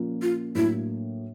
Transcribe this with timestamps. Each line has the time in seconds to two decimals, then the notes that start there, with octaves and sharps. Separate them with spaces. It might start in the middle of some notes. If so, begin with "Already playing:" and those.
Already playing: A#2 F3 A#3 C#4
0.22 F4
0.55 A2 F#3 A#3 D4 E4